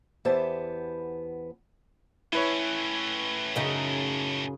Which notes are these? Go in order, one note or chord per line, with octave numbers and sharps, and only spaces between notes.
E2 B3 E4 G4 C5 A5
A2 C#4 E4 B4 C#5
F#2 C#3 D#4